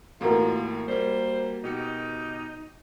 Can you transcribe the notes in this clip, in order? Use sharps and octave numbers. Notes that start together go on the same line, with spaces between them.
E2 A2 A3 A#3 F4 F#4 A#4
G3 A#3 C5
B2 D#4 G4 C#7